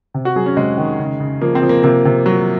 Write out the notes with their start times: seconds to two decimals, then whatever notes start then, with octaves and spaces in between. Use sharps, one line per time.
0.14 C3
0.25 F#4
0.36 F#3 G#4
0.46 C#4
0.57 C3 G#3
0.78 D#3
0.99 C#3
1.20 C#3
1.41 F3 A#3
1.55 C4
1.62 F3
1.69 A#3
1.84 C3 A#3
2.05 C3
2.26 F#3